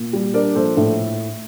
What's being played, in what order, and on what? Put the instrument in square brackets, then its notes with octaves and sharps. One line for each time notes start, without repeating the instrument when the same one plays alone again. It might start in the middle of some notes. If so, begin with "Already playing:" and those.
Already playing: [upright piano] A#2
G3
D4 A#4 D5
A#1 A4 C5
A2 A4